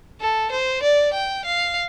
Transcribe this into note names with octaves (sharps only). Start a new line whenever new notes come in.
A4
C5
D5
G5
F5